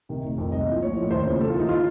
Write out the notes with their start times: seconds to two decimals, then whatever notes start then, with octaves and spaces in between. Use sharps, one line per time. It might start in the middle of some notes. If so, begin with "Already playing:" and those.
0.09 C3 D#3
0.24 F1
0.38 F2 D#3
0.52 C2 D#5
0.67 A#2 F3
0.81 A1 C#5
0.97 A2 F3
1.11 D#2 C5
1.26 C#3 F3
1.40 D#2 A4
1.50 F4
1.54 D#3 D#4
1.69 F4